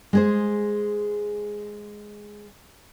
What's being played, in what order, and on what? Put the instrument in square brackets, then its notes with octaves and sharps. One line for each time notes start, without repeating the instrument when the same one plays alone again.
[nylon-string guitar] G#3 G#4 C5